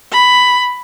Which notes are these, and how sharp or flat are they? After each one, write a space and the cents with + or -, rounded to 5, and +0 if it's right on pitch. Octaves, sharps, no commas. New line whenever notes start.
B5 +10